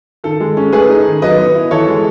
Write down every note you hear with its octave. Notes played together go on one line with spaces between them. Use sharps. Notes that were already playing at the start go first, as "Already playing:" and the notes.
D#3 A4
G#3
C#4
A3 G#4 B4
D#4
D#3
F#3 B4 D#5
B3
E4
E3 A4 C#5
G#3